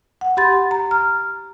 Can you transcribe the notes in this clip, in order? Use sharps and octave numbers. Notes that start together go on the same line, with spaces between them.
F#5
G4 B5 C6 A6
A#5
A#5 F6